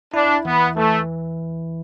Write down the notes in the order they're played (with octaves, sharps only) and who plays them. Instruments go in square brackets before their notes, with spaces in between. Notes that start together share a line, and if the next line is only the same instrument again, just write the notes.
[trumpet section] D4 [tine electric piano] E4
[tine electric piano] E3 [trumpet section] B3
[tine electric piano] E3 [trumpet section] A3